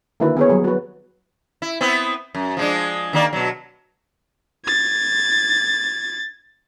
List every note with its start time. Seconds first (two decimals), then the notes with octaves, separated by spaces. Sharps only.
0.20 D3 D#3 A#3 E4 F#4 B4
0.37 B3 G#4 C#5
0.49 F#3 G3 G#4
0.64 F#4 B4
1.62 E4
1.81 B3 C4 E4
2.35 F#2
2.57 F3 G#3 D4
3.13 D#3 A#3 D5
3.33 B2 F#3
4.65 G#6 A6